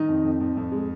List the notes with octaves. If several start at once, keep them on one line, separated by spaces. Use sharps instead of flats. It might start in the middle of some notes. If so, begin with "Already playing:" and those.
Already playing: D#3 D#4
F2
F2
F2
F2
G#3